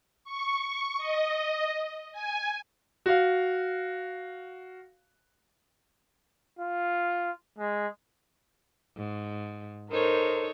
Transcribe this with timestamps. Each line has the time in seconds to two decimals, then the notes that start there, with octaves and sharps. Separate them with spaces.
0.24 C#6
0.98 D#5
2.13 G#5
3.06 F#4 F5
6.59 F4
7.58 G#3
8.96 G#2
9.90 D#4 A4 A#4 C5 C#5